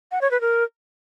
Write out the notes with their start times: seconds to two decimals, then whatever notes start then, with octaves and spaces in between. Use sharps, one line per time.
0.11 F#5
0.21 C#5
0.31 B4
0.41 A#4